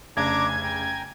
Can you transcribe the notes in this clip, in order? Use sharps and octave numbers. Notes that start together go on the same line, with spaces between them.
F1 C#3 D4 A#5 D6 G#6
G#5
G5 G#5 A#5